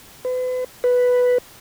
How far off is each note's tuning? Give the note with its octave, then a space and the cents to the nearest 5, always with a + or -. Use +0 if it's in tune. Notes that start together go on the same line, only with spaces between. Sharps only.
B4 +40
B4 +0